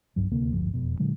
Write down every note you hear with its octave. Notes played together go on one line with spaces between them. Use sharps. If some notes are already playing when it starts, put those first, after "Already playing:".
F#1 B1 G2 F#3
D#1 D2 C3 A#3
G#1 D2 G2 F3
E1 F2 B2
A#2 D3 F#3 G#3